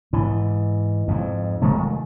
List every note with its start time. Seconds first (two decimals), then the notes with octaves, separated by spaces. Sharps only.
0.13 G#2 E3
1.08 F2 G#2
1.62 F1 D#3 G#3 A3